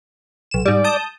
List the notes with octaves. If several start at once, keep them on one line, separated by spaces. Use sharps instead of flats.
B1 E7
G#2 G3 D5
A5 D#6 G6